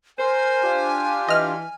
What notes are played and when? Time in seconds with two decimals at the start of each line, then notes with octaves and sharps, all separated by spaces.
0.19 A#4 C5 G#5
0.62 D4 F4 G4
1.29 E3 D#5 F6